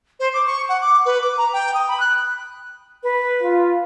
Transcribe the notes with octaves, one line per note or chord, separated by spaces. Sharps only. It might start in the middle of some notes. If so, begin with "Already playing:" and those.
C5
D6
C#6
F#5
D6
B4
D6
A#5
G5
D#6
B5
F#6
B4
F4